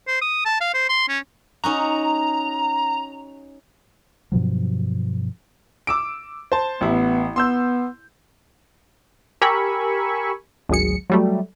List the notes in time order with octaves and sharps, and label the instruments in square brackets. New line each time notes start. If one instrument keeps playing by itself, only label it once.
[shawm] C5
D#6
A5
F5
C5
C6
C#4
[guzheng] C#4 D#4 F#4 [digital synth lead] A#5
[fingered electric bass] G2 B2 F3 F#3
[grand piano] D6 E6 D7
C5 A5
[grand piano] A1 E4 [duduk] B3
[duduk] B3 [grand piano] C6 E6 G6
[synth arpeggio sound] G4 A#4 G#5 B5 C#6 E6
G#1 D2 F#3 G#4 C#7
F#3 G3 A3